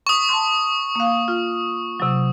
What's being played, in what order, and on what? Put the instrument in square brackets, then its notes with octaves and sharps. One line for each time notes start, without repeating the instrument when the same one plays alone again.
[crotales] C#6 D#6
[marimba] A5 C6
A#3 F5
F4
C3 F#3